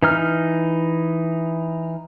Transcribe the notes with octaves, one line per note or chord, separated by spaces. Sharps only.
E3 D#4 F6